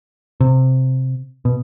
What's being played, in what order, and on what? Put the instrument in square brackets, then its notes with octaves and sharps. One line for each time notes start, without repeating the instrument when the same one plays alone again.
[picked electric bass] C3
B2